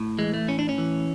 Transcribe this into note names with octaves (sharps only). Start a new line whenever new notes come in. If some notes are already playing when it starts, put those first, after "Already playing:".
Already playing: A2
E3 G#3
A3
A2 C#4
D4
C#4
E3